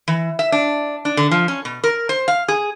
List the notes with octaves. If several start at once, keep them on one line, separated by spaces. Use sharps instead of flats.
E3
E5
D4
D4
D3
F3
C#4
B2
A#4
C5
F5
G#4